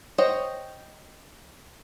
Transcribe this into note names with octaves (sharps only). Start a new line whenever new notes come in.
C5 C#5 D#5 F#5 G5